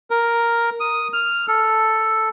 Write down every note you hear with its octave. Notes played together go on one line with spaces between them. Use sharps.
A#4
D#6
F6
A4